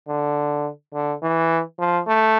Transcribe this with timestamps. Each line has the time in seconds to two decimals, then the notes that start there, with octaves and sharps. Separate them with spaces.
0.08 D3
0.94 D3
1.22 E3
1.79 F3
2.07 A3